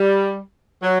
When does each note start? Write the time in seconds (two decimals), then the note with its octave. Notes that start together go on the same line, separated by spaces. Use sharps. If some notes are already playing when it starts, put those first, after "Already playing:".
Already playing: G3
0.82 F#3